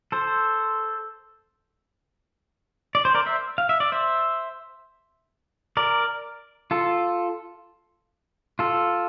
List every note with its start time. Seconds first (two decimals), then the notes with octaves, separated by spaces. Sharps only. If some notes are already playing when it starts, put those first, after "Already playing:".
0.12 A4 C5
2.95 D5
3.05 C5
3.15 A#4 D5
3.26 C5 E5
3.58 F5
3.69 E5
3.80 D5
3.92 C5 E5
5.77 A#4 D5
6.71 F4 A4
8.59 F4 A4